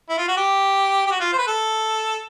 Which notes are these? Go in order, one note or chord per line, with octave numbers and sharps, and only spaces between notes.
E4
F4
F#4
G4
G4
F#4
F4
C5
B4
A4